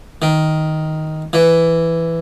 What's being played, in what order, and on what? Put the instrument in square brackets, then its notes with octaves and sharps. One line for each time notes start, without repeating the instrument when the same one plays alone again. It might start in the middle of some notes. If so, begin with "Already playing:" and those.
[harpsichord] D#3
E3